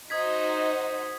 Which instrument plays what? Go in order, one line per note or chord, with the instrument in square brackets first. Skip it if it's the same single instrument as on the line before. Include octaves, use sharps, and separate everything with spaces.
[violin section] D#4 F#4 C5 [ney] D#5 [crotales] D#6 G#6 B6